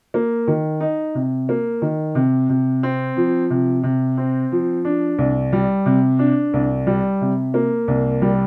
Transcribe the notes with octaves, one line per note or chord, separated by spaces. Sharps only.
A#3
D#3
D#4
C3
A#3
D#3
C3
C3
C4
F3
C3
C3
C4
F3
D4
C2
G3
C3
D4
C2
G3
C3
A#3
C2
G3